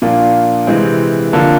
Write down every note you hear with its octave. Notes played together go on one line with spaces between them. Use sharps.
A#2 F3 A#3 D4 F4
C3 E3 G#3 C4
D3 F3 A#3 D4